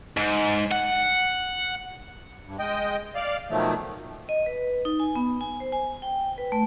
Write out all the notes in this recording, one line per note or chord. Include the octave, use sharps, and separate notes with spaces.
G#2
F#5
G2
G#3 D#5 G5
D5 F5
B2 D#3 F3 F#3 A3
D#5
B4
D#4
G#5
B3
G#5
C5
G#5
G5
B4
A3